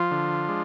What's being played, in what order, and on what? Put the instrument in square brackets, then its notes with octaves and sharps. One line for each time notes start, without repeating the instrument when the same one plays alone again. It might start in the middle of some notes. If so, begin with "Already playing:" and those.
Already playing: [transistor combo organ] F3 F4
D3
G#3 D4